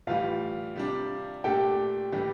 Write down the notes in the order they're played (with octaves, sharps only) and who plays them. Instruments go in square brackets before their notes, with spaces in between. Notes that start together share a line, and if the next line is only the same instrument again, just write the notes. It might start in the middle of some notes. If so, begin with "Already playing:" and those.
[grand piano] A2 E3 G3 [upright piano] F4 F5
[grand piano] C3 G3 D4
[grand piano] A#2 A3 D4 A4 [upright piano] G4 G5
[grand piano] A2 E3 G3 D4